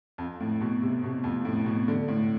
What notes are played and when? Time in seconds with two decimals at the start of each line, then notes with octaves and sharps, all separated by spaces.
0.18 F2
0.40 A2
0.61 B2
0.82 C3
1.04 B2
1.24 F2
1.45 A2
1.66 B2
1.88 D3
2.08 A2